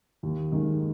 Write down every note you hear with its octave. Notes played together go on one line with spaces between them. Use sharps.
D#2
D#3 G#3